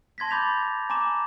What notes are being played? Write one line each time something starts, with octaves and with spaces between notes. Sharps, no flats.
A5 C6 G#6 A#6 B6
B5 C6 D6 G6 A6 F7
G#5 A#5 C6 D6 E7